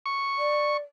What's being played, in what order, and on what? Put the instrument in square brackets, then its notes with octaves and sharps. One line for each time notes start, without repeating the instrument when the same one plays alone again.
[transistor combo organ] C#6
[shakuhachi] D5